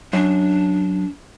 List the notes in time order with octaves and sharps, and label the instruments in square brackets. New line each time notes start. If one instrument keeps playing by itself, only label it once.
[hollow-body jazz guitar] F#2 [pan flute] D4